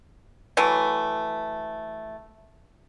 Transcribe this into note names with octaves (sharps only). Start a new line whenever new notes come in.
E3 F#3 A3